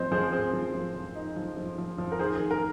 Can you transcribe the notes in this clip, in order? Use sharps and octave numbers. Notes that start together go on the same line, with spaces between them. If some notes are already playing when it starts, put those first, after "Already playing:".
Already playing: F3 C4 C5 D#5
F3 G#4 C5
C4 G#4 C5
F3
F3
F3
D#4
F3
F3
F3
F3
A#4
D#3 G#4 C5
G#4
D#3
A#4